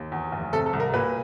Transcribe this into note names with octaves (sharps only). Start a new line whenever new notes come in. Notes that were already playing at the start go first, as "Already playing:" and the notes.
Already playing: D#2
E2
F1
C3 A4
A4
C2
A#4
A#2 B4